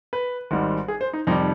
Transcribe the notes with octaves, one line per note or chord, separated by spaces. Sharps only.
B4
G#1 G#2 G3
G#4
C5
D#4
F2 C3 D#3 G3 D#4